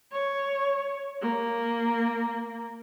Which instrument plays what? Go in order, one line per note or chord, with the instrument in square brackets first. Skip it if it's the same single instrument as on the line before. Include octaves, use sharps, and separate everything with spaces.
[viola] C#5
A#3